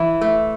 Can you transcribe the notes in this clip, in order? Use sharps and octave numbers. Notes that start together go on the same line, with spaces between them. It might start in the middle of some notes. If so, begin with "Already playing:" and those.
Already playing: E3 E4
A3